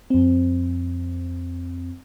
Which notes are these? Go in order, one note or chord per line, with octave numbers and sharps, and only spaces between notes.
F2 C4